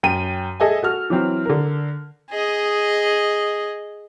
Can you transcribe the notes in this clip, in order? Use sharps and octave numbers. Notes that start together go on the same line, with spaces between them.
F#2 G5 D#7
G#4 A4 D#5 E5 G#5
F#4 A4 F6
E3 F#3 C4
D3 A#4
G#4 D#5